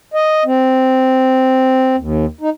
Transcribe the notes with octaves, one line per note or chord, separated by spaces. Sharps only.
D#5
C4
D#2
D#4